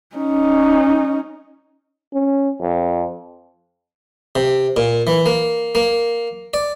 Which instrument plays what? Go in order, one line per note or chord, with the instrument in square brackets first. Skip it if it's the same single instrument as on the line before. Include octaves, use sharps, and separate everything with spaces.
[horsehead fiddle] C#4 D#4
[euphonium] C#4
F2
[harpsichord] C3
A#2
E3
A#3
A#3
D5